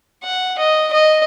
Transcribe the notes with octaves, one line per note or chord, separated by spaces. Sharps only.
F#5
D#5
D#5